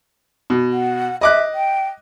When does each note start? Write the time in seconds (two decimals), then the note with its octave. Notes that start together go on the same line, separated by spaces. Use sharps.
0.50 B2
0.72 F#5
1.21 D#5 E5 D6 F#6
1.54 G5